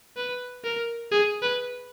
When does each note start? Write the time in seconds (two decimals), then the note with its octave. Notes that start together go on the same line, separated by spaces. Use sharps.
0.17 B4
0.64 A#4
1.11 G#4
1.42 B4